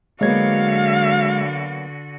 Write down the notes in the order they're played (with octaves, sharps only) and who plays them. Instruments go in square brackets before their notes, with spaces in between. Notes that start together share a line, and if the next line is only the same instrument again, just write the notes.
[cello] D3 F#4 [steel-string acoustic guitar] F#3 A#3 B3 [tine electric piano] G#3 G#6 [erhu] F5